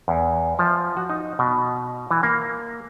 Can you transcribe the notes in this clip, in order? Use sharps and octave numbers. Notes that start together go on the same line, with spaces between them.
E2
F3
F#4
D#4
B2
E3
A#3